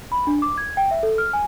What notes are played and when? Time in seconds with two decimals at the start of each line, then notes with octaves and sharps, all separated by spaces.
0.12 B5
0.27 D4
0.42 D6
0.58 G#6
0.77 G5
0.91 E5
1.03 A4
1.18 F6
1.33 G#5